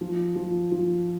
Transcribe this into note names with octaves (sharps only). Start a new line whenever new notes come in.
F3
F3
F3